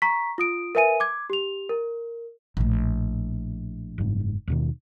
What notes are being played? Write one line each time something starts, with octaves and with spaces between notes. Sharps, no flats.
A#5 C#6 B6
F4 D#6 D7
A#4 B4 E5 G#5 D#7
D6 G#6
G4 F7
A#4
A#1 A2
F#1 G#2
D#2 B2 D#3